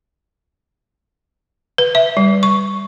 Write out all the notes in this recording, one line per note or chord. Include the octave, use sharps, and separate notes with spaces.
B4
E5
G3
C#6